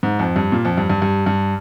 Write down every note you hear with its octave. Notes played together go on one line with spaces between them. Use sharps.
G#2
F2
G2
A#2
F2
G2
G2
G2
G2